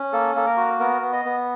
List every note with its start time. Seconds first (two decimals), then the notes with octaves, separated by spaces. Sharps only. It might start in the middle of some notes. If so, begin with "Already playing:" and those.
Already playing: C#4
0.13 A#3 A4
0.35 A#3 A4
0.46 A#4
0.57 F#4
0.80 B3 A#4
1.02 B3
1.13 D#5
1.25 B3